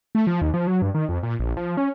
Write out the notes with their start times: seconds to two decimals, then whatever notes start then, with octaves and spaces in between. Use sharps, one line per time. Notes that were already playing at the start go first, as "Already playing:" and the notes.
0.15 A3
0.27 F3
0.42 D#2
0.54 F3
0.67 F#3
0.82 G2
0.95 D#3
1.09 F2
1.23 A#2
1.39 A#1
1.57 F3
1.77 C#4